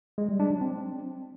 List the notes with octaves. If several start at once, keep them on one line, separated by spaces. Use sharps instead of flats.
G#3
G3
D4
F#3
C4